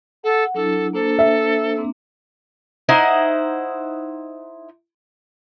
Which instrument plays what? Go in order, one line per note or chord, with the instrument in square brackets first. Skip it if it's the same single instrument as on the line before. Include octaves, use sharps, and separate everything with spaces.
[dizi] A4 [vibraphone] F#5
[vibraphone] F#3 D4 E4 [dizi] A4
[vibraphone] A#3 D4 C5 [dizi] A4
[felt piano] E5
[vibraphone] A#3 C4 D4
[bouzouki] D#4 E4 C5 F#5